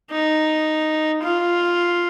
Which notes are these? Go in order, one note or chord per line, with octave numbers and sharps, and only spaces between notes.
D#4
F4